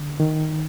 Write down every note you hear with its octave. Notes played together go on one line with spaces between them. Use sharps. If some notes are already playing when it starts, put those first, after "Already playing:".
Already playing: D3
D#3